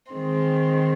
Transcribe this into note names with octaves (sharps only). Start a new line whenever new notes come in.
D#3 G#3 C4